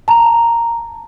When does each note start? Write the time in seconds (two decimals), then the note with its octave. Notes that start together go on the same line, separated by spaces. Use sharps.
0.08 A5 A#5